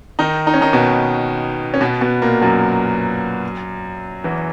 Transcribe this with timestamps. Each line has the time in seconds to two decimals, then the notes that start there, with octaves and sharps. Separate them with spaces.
0.19 D#3 D#4
0.47 D#4
0.54 C#4
0.61 D#3 D#4
0.73 B2 B3
1.74 C#4
1.81 B2 B3
2.01 B2 B3
2.22 A#2 A#3
2.41 F#2 F#3
4.24 E2 E3